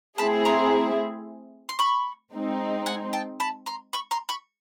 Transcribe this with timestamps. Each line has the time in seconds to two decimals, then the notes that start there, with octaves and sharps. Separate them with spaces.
0.18 A3 C4 E4 G#4 A5 B5
0.45 A#5 C6
1.69 C6
1.79 B5 C#6
2.33 G#3 C4 D#4
2.86 F#5 G#5
3.13 G5 A5
3.40 A5 B5
3.66 A#5 C6
3.93 B5 C#6
4.11 A#5 C6
4.29 B5 C#6